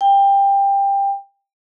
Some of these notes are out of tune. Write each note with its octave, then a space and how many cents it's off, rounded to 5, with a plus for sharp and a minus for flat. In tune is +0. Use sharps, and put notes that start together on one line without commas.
G5 +20